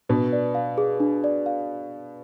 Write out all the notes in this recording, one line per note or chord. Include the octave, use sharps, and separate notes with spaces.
B2 D4
D5
F5
G#4
D4
D5
F5